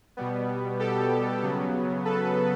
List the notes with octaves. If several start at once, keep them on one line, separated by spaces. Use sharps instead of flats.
B2 G3 B3
G4 A4
C#3 F#3 B3
A4 B4